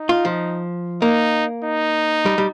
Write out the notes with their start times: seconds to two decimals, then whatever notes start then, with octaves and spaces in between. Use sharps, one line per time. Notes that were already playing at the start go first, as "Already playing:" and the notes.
Already playing: D#4
0.09 F4
0.25 F3
1.02 A#3 D#4
1.64 D#4
2.26 G3
2.38 G3